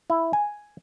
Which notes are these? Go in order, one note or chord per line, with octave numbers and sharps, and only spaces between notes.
E4
G#5